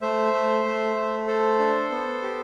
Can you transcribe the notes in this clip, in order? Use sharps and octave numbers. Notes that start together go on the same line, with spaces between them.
A3 C5 E5
A3
A3
A3
A4 C5
D4
B3
G4